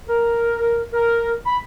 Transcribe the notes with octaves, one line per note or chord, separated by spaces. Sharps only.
A#4
A#4
B5